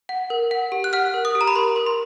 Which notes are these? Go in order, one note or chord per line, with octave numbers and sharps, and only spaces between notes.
F#5
A#4
F#5
G4
F#6
F#5 F6
A#4
D#6
G4
A#5
B5
A#4 C6
A#4
C6